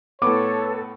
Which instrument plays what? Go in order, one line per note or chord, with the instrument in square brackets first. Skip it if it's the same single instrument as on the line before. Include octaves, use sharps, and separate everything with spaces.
[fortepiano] A2 B3 [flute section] A4 B4 A5 [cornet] C#5 [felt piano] D6